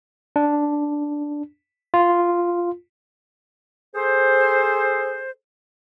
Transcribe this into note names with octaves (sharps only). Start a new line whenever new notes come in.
D4
F4
G#4 A4 C5